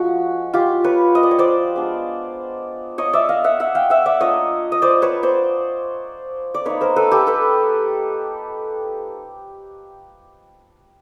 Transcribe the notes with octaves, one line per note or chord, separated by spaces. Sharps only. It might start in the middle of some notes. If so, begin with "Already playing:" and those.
Already playing: F3 G#3 C#4 F#4
F4 G4
B4 C#5
D#5
D5
C#5
C5 D5
G#3 B3 D4
C#5 D#5
D5 E5
D#5 F5
E5 F#5
E5 F#5
F5 G5
E5 F#5
D5 E5
A#3 D4 F4 C#5 D#5
D#5
C5 D5
B4 C#5
C5 D5
D5
A#3 D#4 B4 C#5
A#4 C5
A4 B4
G4 A4
A4 B4